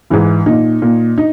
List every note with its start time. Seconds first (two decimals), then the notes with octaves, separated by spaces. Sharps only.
0.10 G#2 E3 E4
0.46 A#2 D#4
0.82 A#2
1.18 D#4